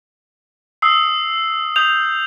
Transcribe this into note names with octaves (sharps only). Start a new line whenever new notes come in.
D#6 E6 C7
D#6 G6 F7